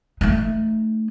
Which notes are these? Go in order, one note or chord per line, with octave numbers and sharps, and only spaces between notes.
A3 D#4